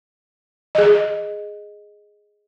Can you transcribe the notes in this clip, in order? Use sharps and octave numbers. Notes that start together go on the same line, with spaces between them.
G#4 D#5